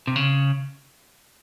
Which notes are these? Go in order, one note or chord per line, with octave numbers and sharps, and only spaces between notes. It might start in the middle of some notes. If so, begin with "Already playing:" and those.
C3
C#3